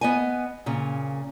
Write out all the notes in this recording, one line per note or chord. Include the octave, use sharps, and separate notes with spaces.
B3 D#5 G#5
A#2 C#3